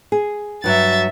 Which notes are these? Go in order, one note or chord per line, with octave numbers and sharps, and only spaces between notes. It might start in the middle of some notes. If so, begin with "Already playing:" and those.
G#4
G2 F#3 E5 A6